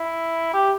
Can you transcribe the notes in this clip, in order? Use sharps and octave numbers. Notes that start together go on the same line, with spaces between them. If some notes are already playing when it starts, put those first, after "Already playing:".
Already playing: E4
G4